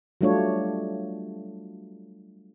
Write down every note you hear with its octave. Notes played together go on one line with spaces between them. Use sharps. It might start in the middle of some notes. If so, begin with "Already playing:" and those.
F#3 G3 A3 D4 F4 C#5